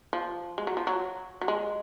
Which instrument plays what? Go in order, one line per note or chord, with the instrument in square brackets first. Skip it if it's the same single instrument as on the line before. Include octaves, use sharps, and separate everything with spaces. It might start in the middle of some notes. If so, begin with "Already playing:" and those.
[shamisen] F3
G#3
F#3
F3
F#3
F#3
G#3